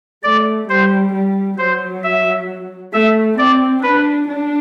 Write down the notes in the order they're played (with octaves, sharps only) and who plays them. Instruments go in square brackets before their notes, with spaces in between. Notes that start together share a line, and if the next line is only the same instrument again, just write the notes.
[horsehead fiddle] A3 [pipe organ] D5
[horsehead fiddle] G3 [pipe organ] C5
[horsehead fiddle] G3
[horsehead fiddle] F#3 [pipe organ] C5
[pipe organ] E5
[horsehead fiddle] A3 [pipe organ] E5
[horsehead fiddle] C4 [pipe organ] D5
[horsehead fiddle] D4 [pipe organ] B4
[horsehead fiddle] D4